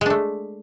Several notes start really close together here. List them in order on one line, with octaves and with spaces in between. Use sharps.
G#3 D4 A3